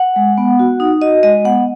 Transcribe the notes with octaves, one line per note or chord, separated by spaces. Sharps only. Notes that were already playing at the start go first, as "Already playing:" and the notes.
Already playing: F#5
G#3
B3
F#4
D#4
F#4 D#5
G#3 D#5
B3 F#5